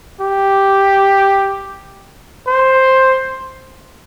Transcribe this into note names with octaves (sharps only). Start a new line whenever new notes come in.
G4
C5